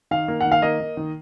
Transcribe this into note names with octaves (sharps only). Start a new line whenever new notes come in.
D#3 F5
A#3
D#3 F#5
F5
A#3 D#5
A#3
D#3